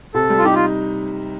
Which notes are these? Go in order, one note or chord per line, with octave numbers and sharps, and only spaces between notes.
C3 A4
G3
F4
D#4 G4
F4